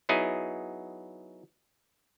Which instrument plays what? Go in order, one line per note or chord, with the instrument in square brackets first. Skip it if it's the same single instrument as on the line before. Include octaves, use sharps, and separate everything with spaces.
[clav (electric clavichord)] F#3 B3 D#4 E4 G#4